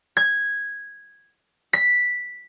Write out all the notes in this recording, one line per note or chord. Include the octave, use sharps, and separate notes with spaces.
G#6
B6